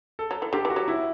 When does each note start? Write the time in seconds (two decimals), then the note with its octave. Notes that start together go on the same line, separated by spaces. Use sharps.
0.19 A4
0.31 F#3
0.42 E3
0.53 D3 G4
0.65 E3
0.70 F#4
0.76 F#3
0.88 E4